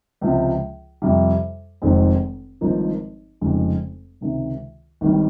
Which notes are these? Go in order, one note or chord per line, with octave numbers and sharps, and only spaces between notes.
C#2 C3 F3
F2 C3 G3
F1 F2 D#3 G#3 C4
G#1 G2 F3 A#3 D#4
F1 F2 C#3 G#3 D#4
C#2 C3 D#3
G#1 G2 D#3 G3